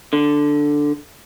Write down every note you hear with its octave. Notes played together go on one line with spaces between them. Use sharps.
D3